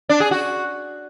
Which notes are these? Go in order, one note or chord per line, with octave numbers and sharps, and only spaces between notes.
D4
G#4
F#4